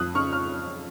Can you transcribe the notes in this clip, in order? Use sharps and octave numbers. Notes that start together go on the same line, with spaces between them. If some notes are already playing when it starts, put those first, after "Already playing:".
Already playing: F2 D#6 F#6
C#3 C#6 F6
F6